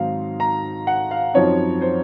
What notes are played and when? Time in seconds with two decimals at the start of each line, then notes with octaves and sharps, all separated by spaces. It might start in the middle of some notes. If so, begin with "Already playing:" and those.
Already playing: G#2 D#3 F#3 C4 D#4 F5
0.40 A#5
0.87 F#5
1.11 F5
1.34 F#2 F3 C4 D#4 C#5
1.81 C5